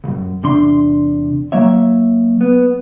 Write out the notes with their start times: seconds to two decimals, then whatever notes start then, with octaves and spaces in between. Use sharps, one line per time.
0.04 C#2 F#2
0.43 E2 C3 D4 C6
1.52 F#3 A#3 C#5 E5
2.41 B3